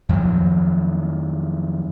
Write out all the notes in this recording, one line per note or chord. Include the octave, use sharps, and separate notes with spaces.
F2 D#3 F3 F#3